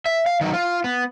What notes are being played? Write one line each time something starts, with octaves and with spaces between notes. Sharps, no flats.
E5
F5
D#3 F#3
F4
B3